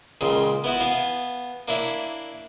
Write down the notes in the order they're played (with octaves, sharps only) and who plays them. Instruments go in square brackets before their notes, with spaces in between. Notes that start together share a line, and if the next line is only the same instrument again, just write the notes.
[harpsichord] C#2 A#2 C#3
B3 E4 F#4
B3 F5 G#5 A5
A#3 D4 E4 C#5 E5